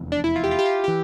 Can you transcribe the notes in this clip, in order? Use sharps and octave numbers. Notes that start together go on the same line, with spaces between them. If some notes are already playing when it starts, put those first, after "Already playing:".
Already playing: F1 E2 E3
D4
E4
F4
G4
F4
G4
F4
E3 G4